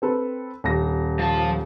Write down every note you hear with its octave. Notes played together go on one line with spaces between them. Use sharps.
C4 A4 B4
D#1 A#6
F3 A5